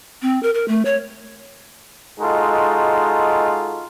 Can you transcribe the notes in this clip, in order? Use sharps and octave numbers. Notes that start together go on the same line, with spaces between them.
C4
A#4
A#4
A3
C#5
G#3 D#4 F4 F#4 A4